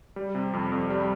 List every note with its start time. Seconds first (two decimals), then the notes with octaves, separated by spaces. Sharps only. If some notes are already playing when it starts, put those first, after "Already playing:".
0.16 G3
0.35 C3
0.53 F2
0.72 F2
0.90 G3